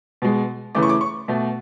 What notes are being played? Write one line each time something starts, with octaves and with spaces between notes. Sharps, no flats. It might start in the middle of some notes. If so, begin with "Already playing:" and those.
B2 G#3
C#3 E3 A3 D6
C#6
D6
C#6
B2 A3